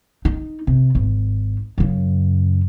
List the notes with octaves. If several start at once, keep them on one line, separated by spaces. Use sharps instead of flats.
D#4
C3
G#1
F#2 C#3